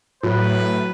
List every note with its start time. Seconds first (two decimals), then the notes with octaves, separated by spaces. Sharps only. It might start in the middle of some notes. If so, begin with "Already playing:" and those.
0.23 A2 F#3 B4